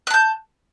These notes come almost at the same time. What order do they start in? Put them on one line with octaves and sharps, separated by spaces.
F#6 A5 G6